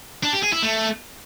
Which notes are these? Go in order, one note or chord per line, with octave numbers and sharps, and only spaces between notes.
D4
G4
G#4
E4
A3